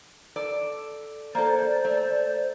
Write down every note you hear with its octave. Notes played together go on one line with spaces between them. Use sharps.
A4 D5
A#3 A4 C5 D5
A3